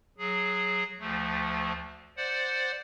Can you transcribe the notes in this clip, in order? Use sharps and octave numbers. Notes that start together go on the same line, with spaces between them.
F#3 G#4
D2 F3 A3
C5 D5 F#5